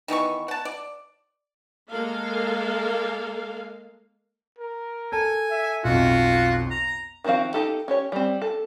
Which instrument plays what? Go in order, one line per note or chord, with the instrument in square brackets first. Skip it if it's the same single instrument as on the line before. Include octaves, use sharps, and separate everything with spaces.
[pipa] D#3 E3 B3 C#6
F#5 A5
D5
[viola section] G#3 A#3 A4 A#4 F5
[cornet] A#4
[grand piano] A4 [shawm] G#5
[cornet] E5
[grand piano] B1 F2 [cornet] F4 [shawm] F#4
[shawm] A#5
[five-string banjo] D#3 F3 C4 F#4 F5
D#4 G4 A4
C#4 G4 C#5
G3 C4
A4